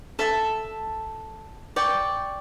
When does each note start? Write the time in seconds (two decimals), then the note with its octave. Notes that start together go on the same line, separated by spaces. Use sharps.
0.19 A4 E5 A5
1.76 D5 G5 C#6